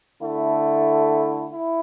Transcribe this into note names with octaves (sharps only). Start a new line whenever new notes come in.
D3 A3 E4
E4